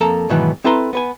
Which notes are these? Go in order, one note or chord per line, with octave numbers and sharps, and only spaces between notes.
F2 A#3 A4 A5 A#5
G#2 B2 D#3 E3 F#3 B3
C4 E4 A4 B4 A#5 C6
B3 B4 G#5